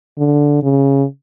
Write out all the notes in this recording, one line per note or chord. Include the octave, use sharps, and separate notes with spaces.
D3
C#3